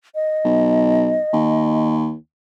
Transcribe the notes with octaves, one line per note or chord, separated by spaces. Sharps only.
D#5
B1
D#2